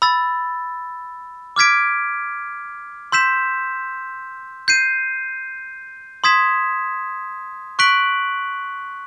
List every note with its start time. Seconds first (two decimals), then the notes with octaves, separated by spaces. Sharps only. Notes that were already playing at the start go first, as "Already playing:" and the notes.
0.02 B5 E6 A6
1.56 D6 F6 G#6 B6 D7
3.12 C6 E6 G6 B6 E7
4.68 G6 C7 D#7
6.24 C6 D#6 G#6 B6 E7
7.79 C#6 F#6 B6 D7 F#7